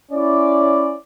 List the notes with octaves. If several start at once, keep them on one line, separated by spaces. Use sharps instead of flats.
C#4 E4 D5